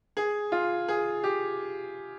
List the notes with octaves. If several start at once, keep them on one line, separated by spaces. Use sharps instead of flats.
G#4
F4
G#4
G4